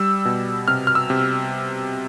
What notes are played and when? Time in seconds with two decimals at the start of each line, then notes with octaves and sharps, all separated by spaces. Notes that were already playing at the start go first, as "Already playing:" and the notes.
Already playing: G3 E6
0.25 B2
0.68 C3 F6
0.87 F6
0.95 E6
1.10 C3